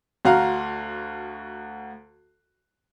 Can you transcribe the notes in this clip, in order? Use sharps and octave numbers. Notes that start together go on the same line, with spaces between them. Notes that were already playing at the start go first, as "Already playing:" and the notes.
D2 F#4 F5 A#5